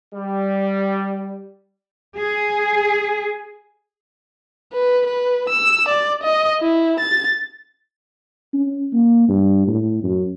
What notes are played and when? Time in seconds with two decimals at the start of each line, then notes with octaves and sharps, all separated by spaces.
0.14 G3
2.17 G#4
4.73 B4
5.07 B4
5.49 E6
5.89 D5
6.23 D#5
6.61 E4
7.00 A6
8.53 C#4
8.93 A#3
9.28 G2
9.67 A2
10.03 F#2